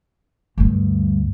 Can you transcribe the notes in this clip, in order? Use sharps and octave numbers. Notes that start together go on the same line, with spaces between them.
D2 G2